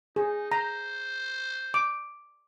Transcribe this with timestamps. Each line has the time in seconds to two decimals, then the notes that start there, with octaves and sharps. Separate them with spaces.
0.16 D#4 G#4
0.52 C5 A#5
1.74 D6